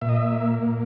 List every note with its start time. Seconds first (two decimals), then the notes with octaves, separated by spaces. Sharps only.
0.01 A#2 E5
0.09 D#5
0.16 E5
0.32 A#3
0.63 A#2